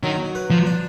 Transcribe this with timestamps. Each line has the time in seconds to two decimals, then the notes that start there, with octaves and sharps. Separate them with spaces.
0.03 D#3 F#3
0.35 B4
0.50 F3
0.66 D4